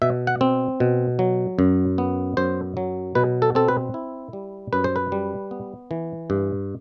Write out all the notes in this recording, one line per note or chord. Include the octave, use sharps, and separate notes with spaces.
B2 E5
F#5
C4
B2
F#3
F#2
B3
F#2 C5
F#3
B2 B4
A4
C4 A4
B4
E4
G3
F#2 B4
C5
B4
G3
B3
E3
G2